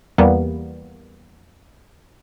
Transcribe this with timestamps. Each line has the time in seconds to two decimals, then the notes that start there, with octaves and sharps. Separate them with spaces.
0.18 E2 G3 A#3 B3